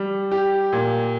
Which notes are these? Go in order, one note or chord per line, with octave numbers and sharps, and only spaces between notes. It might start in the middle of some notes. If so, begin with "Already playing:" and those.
Already playing: G3
G4
A#2